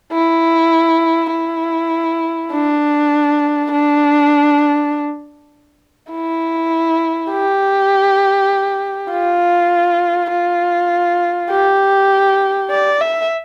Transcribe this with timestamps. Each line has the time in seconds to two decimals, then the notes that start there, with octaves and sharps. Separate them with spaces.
0.13 E4
1.32 E4
2.52 D4
3.72 D4
6.12 E4
7.31 G4
9.11 F4
10.31 F4
11.50 G4
12.71 D5
13.00 E5